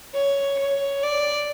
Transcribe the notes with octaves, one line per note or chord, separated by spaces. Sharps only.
C#5
C#5
D5